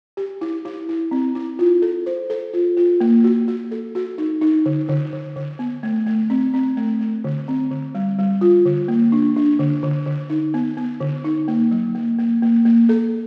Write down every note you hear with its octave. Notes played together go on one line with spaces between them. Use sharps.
G4
E4
E4
E4
C4
E4
F4
A4
C5
A4
F4
F4
A#3
F#4
F#4
A4
F#4
D#4
D#4
D3
D3
D3
D3
B3
A3
A3
C4
C4
A3
A3
D3
C4
D3
G3
G3
F4
D3
A#3
D4
D4
D3
D3
D3
D#4
B3
B3
D3
D#4
A#3
F#3
A#3
A#3
A#3
A#3
A4